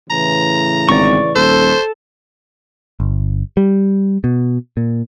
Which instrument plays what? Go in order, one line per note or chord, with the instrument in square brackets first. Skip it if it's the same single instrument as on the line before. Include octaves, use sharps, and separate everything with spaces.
[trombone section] A2 C#3 E3 [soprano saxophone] A#5
[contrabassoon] G#1 [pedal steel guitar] D5 C#6
[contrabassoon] D#1 [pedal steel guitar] A4 [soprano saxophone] C5
[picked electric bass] G1
G3
B2
A#2